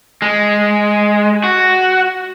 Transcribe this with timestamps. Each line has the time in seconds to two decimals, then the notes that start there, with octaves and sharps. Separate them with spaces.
0.22 G#3
1.44 F#4